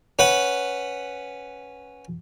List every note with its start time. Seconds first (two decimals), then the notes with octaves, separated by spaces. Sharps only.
0.19 C#4 B4 F#5